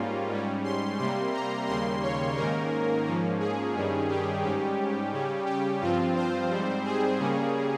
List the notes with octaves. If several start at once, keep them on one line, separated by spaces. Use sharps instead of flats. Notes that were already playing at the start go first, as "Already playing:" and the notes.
Already playing: G#2 G3 A#3 C#4 F4
G#2 G3 C#4
C6
C3 G3 A#3 C6
A#5
D#2 C#3 G3 A#3 C6
C#5
G#2 D#3 A#3 C#4 A#4
G#2 F3 A#3 C#4
G#4
G2 D#3 G3 C#4
G4
G#2 G3 C#4
C#3 G3 C#4
G4
G2 F3 C4 F4
C5
G#2 G3 C4
G#4
C#3 G3 A#3 C#4